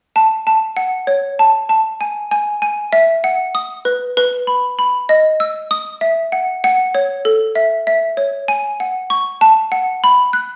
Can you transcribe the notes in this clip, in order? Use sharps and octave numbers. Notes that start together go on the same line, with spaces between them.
A5
A5
F#5
C#5
A5
A5
G#5
G#5
G#5
E5
F#5
D#6
B4
B4
B5
B5
D#5
E6
D#6
E5
F#5
F#5
C#5
A4
E5
E5
C#5
G#5
F#5
C#6
A5
F#5
B5
F#6